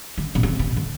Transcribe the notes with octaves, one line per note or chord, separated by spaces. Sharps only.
D3
B2
C3
B2
D3